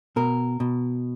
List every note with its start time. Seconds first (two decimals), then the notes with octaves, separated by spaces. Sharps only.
0.16 B2 A#4
0.60 B2